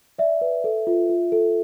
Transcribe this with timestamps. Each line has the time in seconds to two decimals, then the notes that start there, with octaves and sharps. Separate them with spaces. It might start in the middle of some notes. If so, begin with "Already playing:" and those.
0.19 D5 E5
0.41 B4
0.64 A4
0.87 F4
1.09 F4
1.32 A4